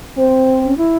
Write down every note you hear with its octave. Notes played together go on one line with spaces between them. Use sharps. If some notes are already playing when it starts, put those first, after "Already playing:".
C4 C5
C#4
E4